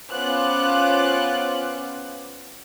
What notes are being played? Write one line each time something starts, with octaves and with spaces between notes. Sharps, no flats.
B3 C#4 F4 C5 D6 F#6